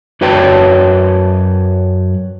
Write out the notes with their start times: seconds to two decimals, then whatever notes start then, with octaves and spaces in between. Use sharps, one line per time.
0.21 F#2 F#4 B4 C#5 G5 A5